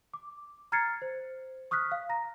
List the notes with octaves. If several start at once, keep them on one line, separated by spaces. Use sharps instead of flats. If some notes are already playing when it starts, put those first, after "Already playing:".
D6
A#5 F6 G#6 A6 C7 C#7
C5
C#6 D#6 F6 F#6 B6
F5
A#5 A#6